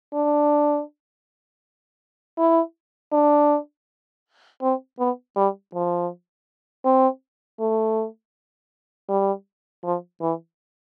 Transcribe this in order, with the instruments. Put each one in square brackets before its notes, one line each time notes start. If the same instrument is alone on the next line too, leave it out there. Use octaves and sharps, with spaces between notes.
[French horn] D4
E4
D4
C4
B3
G3
F3
C4
A3
G3
F3
E3